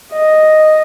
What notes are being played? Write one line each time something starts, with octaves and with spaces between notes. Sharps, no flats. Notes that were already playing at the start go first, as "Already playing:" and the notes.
D#5